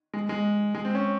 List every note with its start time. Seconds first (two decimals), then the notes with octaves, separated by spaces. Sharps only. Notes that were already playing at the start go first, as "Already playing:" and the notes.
0.14 G#3
0.29 G#3
0.75 G#3
0.85 C4
0.95 C#4